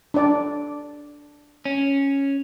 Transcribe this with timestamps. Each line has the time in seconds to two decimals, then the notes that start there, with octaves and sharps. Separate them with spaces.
0.14 D4 D5
1.65 C#4